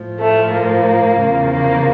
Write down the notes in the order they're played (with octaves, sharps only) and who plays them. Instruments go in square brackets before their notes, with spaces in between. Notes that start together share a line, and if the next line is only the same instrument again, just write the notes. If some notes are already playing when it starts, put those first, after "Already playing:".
Already playing: [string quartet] A2 F3
A3
A#3
E2 C#3 F3
A#3